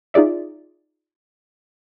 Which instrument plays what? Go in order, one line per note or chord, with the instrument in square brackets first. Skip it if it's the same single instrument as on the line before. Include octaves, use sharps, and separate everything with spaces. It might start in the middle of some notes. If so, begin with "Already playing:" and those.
[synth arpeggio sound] D#4 F4 G#4 D5 E5